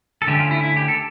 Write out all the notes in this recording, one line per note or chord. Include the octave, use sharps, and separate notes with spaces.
A4
D3 A3 C#4 G4
F4
E4
E4
G4
A4